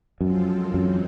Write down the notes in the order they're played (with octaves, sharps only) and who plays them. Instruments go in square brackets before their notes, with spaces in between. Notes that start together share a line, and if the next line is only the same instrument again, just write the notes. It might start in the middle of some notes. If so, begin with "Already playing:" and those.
[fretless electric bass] F#2 [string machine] F3 G#3 C4 F4 A4
[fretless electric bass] F#2 [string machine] E3 G#3 C4 D#4